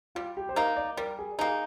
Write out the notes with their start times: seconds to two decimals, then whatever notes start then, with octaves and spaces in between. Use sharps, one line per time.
0.15 G3 F4
0.37 G4
0.49 C5
0.56 A#3 D#4 A#4
0.77 D5
0.97 G3 A#4
1.19 G#4
1.39 A#3 D#4 G#4